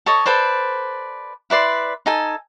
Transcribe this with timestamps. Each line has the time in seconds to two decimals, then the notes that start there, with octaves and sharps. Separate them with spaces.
0.06 A4 C#5 D#5
0.26 A4 B4 C5 D5
1.50 E4 B4 D5 C6
2.06 D#4 A4 G#5